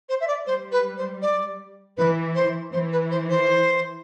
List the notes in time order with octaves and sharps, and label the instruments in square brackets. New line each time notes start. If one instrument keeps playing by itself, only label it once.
[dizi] C5
E5
D5
[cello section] G3 [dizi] C5
[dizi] B4
C5
D5
[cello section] E3 [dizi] B4
[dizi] C5
[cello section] E3 [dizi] C5
[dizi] B4
C5
C5